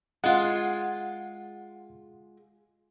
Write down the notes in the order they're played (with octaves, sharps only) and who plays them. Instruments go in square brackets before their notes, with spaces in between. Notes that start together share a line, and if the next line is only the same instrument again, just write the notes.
[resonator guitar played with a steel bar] G#3 F4 [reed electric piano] F#5